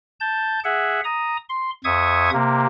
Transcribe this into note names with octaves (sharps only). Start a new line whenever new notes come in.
A5 G6
G#4 E5 F#5
A#5 D#6
C6
F2 E5 C#6 D#6 G#6
C3 A#3